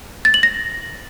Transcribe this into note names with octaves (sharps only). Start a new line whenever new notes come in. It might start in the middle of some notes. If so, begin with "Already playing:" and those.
A6
F#7
A#6